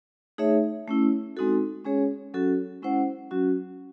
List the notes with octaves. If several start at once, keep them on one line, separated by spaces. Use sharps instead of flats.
A3 D#4 G#4 C#5 E5
A3 C#4 E4
G#3 C4 D#4 F#4 A4
G#3 C#4 G#4 C#5
F#3 C#4 F#4 A4
G#3 C#4 E4 C5 F#5
F#3 C#4 F#4